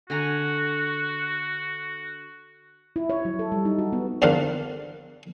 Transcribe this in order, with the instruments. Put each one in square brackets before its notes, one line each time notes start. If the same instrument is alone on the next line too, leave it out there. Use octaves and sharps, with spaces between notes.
[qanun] D3 G#5 A#5 [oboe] F#4
[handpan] E4
C#5
F#3
A4
G3
D#4
F#4
B3
[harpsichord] E2 D3 A#3 C5 F5 F#5